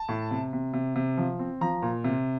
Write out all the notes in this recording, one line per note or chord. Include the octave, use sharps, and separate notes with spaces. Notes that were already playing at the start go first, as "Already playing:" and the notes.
Already playing: A5
A2
C3
C3
C3
C3
F3
C4
F3 A#5
A#2
C3